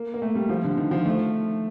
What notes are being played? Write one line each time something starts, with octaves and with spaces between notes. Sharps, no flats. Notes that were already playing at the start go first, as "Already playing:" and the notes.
Already playing: A#3
A#3
A3
G3
F3
D3
D#3
F3
A3